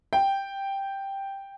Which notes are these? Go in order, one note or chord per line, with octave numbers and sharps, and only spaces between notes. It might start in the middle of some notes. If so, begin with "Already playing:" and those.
G5